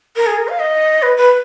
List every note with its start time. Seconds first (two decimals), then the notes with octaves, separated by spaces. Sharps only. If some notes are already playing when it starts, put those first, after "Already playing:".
0.16 A#4
0.26 G#4
0.37 A#4
0.48 F5
0.59 D#5
1.02 B4
1.17 B4